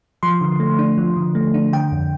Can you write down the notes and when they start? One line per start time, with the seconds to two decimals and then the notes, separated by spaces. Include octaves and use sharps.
0.23 F3 C6
0.41 D3
0.60 A3
0.79 D4
0.98 F3
1.16 D3
1.35 A3
1.54 D4
1.73 D3 G5
1.92 F2